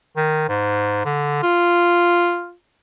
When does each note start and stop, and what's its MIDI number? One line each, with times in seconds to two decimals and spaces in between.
0.17 0.45 51
0.48 1.02 44
1.05 1.42 50
1.43 2.53 65